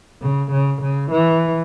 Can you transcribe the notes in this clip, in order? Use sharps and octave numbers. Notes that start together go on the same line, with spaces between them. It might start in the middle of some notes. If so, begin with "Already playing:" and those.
C#3
C#3
C#3
E3